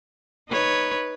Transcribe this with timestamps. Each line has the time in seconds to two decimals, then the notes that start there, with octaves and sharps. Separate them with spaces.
0.50 D#4 B4 C#5